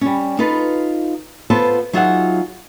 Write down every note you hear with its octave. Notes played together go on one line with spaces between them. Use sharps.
G3 C#4
D#4 F4 A4 B4
B3 F4 A4 B4 C5
F#3 D#4 F4 G#4 E5 F#5